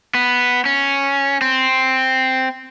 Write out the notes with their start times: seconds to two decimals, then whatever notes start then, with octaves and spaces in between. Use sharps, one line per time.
0.15 B3
0.66 C#4
1.41 C4